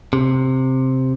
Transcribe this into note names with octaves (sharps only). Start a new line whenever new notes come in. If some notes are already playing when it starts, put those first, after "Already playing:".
C3